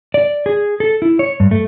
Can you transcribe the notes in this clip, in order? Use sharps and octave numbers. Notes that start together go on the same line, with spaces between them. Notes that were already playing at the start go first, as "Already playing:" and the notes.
D5
G#4
A4
E4
C#5
G2
A3